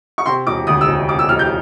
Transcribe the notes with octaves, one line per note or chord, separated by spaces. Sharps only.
C#6
C3 C6
E1 D6
D2 D#6
E6
E1
C3 D6
E6
E1 F6
G6